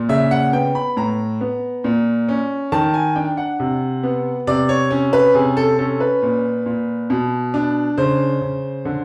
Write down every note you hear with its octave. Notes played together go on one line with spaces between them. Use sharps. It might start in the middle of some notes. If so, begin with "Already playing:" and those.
Already playing: A#2
C#3 E5
F#5
B3 G5
B5
A2 A#5
B3
A#2
C#4
D#3 A5
G#5
D4 G5
F#5
C3
B3
C3 D5
C#5
C#4
B4
C3 G#4
A4
C#4 A4
B4
A#2
A#2
B2
D4
C#3 C5
C#3
D3